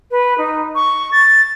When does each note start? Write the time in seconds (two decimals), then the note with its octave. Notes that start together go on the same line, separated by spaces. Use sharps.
0.11 B4
0.38 D#4
0.75 C#6
1.12 A6